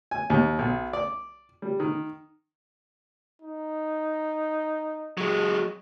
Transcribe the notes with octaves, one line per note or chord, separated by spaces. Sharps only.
G#5
D#2
B1
D5
G3
D#3
D#4
F#3 G#3